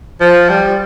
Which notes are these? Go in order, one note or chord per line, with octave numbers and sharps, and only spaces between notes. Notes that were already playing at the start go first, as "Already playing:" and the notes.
F3
G3